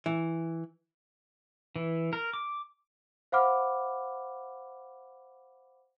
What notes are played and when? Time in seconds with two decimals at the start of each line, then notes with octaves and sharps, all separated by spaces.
0.06 E3
1.76 E3
2.13 A#4
2.33 D6
3.32 C5 F5 F#5 B5 D6 F6